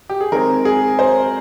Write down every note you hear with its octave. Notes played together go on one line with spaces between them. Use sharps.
G4
G#4
D#3 G#3 C4 A#4
G#4
C5